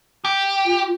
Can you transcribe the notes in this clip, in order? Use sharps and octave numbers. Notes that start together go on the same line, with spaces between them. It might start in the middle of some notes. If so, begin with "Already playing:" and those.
G4
F4